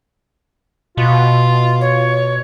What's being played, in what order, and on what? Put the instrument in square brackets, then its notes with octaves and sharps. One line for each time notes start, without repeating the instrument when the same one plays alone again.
[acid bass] B2 [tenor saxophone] F4
[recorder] C#5